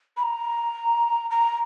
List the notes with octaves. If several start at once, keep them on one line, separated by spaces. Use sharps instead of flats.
B5
A#5
A#5